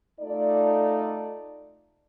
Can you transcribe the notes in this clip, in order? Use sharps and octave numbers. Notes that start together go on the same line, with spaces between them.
A3 D#4 F4 A4 D5